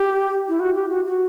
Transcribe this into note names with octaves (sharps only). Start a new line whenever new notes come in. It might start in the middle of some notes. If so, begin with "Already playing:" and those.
Already playing: G4
E4
F#4
G4
F#4
F#4